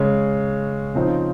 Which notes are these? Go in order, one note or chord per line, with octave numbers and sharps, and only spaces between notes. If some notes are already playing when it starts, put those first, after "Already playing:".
Already playing: C#3 G#3 C#4
C#3 F3 C4 D#4